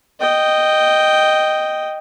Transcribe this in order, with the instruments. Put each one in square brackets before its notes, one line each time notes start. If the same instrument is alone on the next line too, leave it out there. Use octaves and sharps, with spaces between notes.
[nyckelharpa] D#5 G5